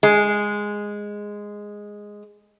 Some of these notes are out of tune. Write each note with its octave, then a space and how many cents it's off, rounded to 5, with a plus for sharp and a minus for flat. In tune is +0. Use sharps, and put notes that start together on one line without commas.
G#3 -5